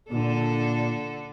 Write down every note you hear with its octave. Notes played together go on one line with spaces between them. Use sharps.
A#2 D3 D4 A4